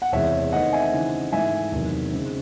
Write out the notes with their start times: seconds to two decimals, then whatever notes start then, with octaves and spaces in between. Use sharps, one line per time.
0.02 F#5
0.13 E2 C3 E3 G#3 C#5 E5
0.52 D#3 A3 C4 D#5 F#5
0.73 E5 G#5
0.93 C#3 E3 C4 D#4
1.32 G#2 E3 A3 E5 G#5
1.72 E2 C3 D#3 F#3
2.12 C#3 G#3 C4 D#4